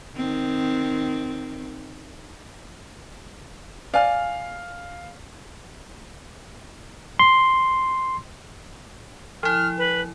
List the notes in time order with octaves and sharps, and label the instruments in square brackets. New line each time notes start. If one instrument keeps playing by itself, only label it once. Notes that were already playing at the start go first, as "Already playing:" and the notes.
[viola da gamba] D#3 C4
[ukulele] D5 G#5 [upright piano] F5 F6
[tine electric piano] C6
[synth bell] F3 E4 [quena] F6
[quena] B4